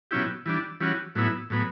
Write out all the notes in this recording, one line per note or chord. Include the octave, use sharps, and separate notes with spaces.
B2 F#3 C#4 E4 G4
E3 G3 D4
E3 G3 C#4 F#4
A2 F#3 B3 E4
A2 F#3 B3